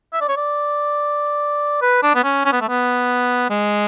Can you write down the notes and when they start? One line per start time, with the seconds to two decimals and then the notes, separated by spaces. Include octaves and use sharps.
0.13 E5
0.21 D5
0.29 C#5
0.37 D5
1.82 B4
2.03 D4
2.15 B3
2.24 C#4
2.45 C#4
2.53 B3
2.61 A3
2.69 B3
3.50 G#3